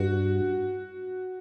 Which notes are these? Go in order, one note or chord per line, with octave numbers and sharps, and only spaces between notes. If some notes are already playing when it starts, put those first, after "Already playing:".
Already playing: G2 F#4